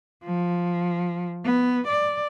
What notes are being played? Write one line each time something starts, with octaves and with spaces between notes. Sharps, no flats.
F3
B3
D5